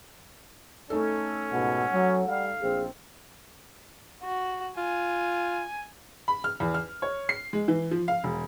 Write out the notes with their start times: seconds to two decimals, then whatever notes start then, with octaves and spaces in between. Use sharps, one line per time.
0.90 A3 C#4 D#4 A4
1.52 C#2 G#2 B2 F#5
1.92 F#3
2.27 G3 F5
2.61 A#1 C4 G#4
4.23 F#4
4.77 F4 G#5
6.28 B5
6.44 F6
6.60 E2
6.74 F6
7.02 C#5
7.29 C7
7.53 G#3
7.68 E3
7.91 F3
8.08 F5
8.24 E1